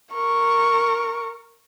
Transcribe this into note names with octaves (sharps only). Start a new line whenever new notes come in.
A#4 C#6